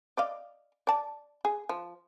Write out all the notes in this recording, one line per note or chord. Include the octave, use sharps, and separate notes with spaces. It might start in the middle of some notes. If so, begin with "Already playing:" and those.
D5 D#5 F5
D5 A5
G#4
F3